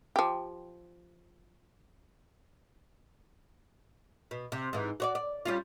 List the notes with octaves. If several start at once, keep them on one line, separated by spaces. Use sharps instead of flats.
F3 G4
B2
C3
G#2 E3
F#4 C#5 D5
D5
G3 C#4 F4